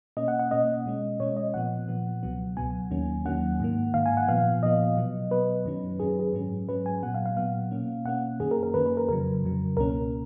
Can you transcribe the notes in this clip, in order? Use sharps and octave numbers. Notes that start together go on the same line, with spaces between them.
B2 A#3 C#4 D#5
F#5
F#5
B2 A#3 C#4 D#5
B2 G#3 C#4
B2 G#3 C#4 C#5
D#5
A#2 F3 B3 F#5
A#2 F3 B3
C#2 B2 F#3 B3
C#2 B2 F#3 B3 G#5
D#2 D#3 F#3 A#3 C#4
D#2 D#3 F#3 A#3 C#4 F#5
G#2 D#3 A#3
G#2 D#3 A#3 F5
G#5
F#5
A#2 F3 B3 F5
A#2 F3 B3 D#5
B2 F#3 B3
B2 F#3 B3 B4
F#2 D#3 F#3 C#4
F#2 D#3 F#3 C#4 G#4
G#4
G#2 F#3 C#4
G#2 F#3 C#4 B4
G#5
A#2 F#3 B3 F#5
F5
F5
A#2 F#3 B3 F5
B2 A#3 C#4
B2 A#3 C#4 F#5
F#2 D#3 A#3 C#4 G#4
A#4
A#4
F#2 D#3 A#3 C#4 B4
B4
A#4
F2 C#3 F#3 A#4
F2 C#3 F#3
C#2 B2 A#3 C#4 A#4